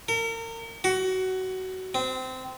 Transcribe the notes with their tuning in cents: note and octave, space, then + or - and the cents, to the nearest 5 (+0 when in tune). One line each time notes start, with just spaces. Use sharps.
A#4 -35
F#4 +20
C4 -20